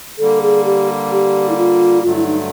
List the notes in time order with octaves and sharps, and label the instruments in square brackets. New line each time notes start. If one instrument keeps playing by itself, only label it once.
[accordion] D3 G3 A#3 [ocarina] A4
[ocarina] G#4
G4
G4
E4
F4
[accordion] G2 D3 F#3 A3 [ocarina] F4
[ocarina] E4
D#4